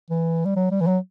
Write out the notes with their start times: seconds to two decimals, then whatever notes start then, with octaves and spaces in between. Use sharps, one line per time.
0.10 E3
0.45 G3
0.56 F#3
0.71 G3
0.81 E3
0.87 F#3